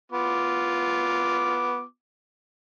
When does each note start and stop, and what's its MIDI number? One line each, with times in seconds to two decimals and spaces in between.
0.12 1.83 59
0.12 1.83 65
0.12 1.83 86